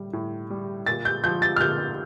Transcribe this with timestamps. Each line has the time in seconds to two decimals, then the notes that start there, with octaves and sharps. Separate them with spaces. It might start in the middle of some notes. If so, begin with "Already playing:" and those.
Already playing: A2 G3
0.13 A2
0.50 G3
0.86 A#2 A6
1.05 G6
1.24 F3 G6
1.42 A6
1.56 F6
1.61 A#2 G6